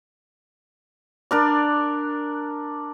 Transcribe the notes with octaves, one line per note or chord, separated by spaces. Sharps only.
D4 A#4 D5